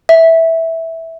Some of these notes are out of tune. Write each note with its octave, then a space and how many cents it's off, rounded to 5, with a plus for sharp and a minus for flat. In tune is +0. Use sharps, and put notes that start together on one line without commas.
E5 -10